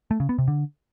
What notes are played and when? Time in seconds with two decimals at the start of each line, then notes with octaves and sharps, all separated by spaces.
0.11 A3
0.20 C#3
0.29 B3
0.38 C3
0.48 D3